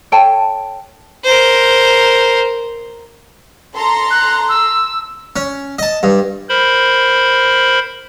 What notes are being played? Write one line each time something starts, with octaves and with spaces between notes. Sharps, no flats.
A4 C#5 G5 A5
A#4 C5
A4 A#5 C6
F#6
E6
C#4
D#5 A5
G2
A#4 C5 B5